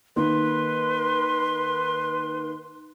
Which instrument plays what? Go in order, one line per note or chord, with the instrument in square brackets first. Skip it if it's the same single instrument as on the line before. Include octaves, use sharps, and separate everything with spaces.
[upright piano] D#3 A#3 [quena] B4 [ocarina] C6